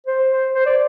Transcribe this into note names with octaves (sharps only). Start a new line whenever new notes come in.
C5
C5
C5
D5